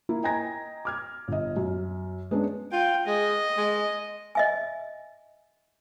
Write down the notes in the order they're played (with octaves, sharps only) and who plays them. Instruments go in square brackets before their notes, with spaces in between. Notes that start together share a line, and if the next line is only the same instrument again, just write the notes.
[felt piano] A#3 E4
D#5 G5 G#5 A#5 G#6 A#6
D6 F6 G#6
G1 D#5
F#2
G#3 B3 C#4 D4
[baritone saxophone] F4 [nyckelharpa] G5
[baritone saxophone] G#3 [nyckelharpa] D#5
[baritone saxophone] G#3
[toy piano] D#5 E5 G#5